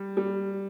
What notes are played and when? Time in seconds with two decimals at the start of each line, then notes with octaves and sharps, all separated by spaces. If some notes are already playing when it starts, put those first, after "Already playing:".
Already playing: G3
0.17 G3